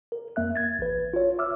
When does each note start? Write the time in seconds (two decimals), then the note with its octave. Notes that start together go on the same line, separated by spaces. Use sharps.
0.12 A#4
0.36 F2 A#3 E5 F#6
0.56 G#6 A6
0.79 A1 B4
1.14 F4 C#5
1.39 E5 D6 E6 F6